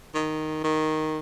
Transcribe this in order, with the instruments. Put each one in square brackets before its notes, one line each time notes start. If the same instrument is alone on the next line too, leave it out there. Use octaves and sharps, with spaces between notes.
[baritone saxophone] D#3
D#3